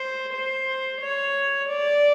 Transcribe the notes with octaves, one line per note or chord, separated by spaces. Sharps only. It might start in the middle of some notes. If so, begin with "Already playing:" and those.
Already playing: C5
C5
C#5
D5